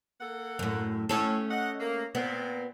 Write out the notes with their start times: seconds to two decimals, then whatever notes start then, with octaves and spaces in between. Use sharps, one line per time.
0.20 A#3 A4 F#5
0.59 F#2 A2
1.09 A2 A3 C#4 A4
1.50 D#5 F#5
1.79 A#3
2.15 A#2 B3 C4